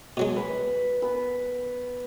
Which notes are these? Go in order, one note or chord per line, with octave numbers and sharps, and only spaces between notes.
B2 F#3 G#3
B4
B3 B4